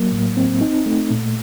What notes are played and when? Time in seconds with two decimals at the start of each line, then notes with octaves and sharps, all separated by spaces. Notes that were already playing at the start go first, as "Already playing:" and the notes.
Already playing: F#3 A#3
0.12 A2
0.37 C4
0.61 D#4
0.86 A3
1.11 A#2